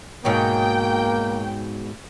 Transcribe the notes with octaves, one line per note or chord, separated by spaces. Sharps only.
G#2 B2 F#3 A#3 G5